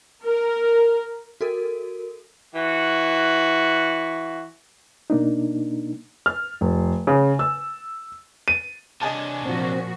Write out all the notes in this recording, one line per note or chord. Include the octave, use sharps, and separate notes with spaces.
A#4
F#4 A4 A#4
E3 F#4
B2 A#3 D4 D#4
F6
F1
C#3
E6
D#7
C3 D4 D#5 G#5 A5
A#2 F3 C4 F#4